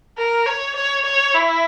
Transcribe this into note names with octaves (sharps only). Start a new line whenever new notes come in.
A#4
C#5
C#5
C#5
E4